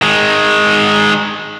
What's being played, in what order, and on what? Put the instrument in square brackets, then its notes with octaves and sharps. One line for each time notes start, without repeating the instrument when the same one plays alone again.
[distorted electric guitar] D#3 G#3